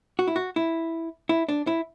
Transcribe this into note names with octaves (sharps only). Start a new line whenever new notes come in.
F#4
E4
F#4
E4
E4
D4
E4